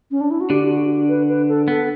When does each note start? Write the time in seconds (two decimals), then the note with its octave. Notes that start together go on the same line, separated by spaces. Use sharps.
0.11 C#4
0.21 D4
0.31 E4
0.40 F#4
0.50 D3 D4 G4
0.70 F#4
1.09 B4
1.29 B4
1.48 A4
1.68 B3 A4